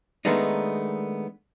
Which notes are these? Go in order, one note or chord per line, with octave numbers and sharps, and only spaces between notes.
D#3 G#3 A3 B3 D4 D#4